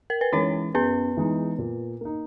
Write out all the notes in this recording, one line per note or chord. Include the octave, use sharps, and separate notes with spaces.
A#4
B4
E3 G#3 C#4 D#4 C#5
F#2 B3 B4
E3 G#3 D#4
A#2
A#3 D#4